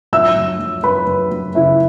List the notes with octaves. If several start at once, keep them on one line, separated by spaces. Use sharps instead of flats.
F#3 E5 E6
F#3
F#3
F#3 B4 B5
F#3
F#3
C#3 E4 E5